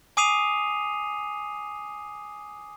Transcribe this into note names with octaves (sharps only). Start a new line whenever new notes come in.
G#5 D6 D#6 C7 D#7 F7